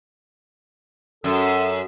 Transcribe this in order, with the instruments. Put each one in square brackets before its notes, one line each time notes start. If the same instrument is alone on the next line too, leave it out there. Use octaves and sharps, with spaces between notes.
[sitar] F#2 [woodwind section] A4 E6